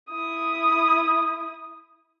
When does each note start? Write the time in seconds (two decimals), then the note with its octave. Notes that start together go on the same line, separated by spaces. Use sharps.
0.10 E4 D#6